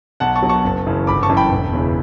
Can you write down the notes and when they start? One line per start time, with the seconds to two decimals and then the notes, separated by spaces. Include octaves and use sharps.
0.20 B1 F#5 A5
0.35 A5 C#6
0.42 B2 F#3
0.49 A5 C#6
0.64 F#1
0.86 F#2 C#3 E3
1.07 G1 B5 D6
1.23 A5 C#6
1.29 F#2 E3
1.37 G5 B5
1.52 E1
1.73 E2 C#3 E3